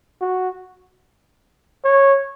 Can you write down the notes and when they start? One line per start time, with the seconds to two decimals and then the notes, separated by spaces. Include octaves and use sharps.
0.21 F#4
1.84 C#5